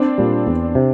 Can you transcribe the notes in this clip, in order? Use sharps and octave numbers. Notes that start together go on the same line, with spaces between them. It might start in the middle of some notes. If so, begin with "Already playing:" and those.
Already playing: C4 D4
A#2 G3
E2
C3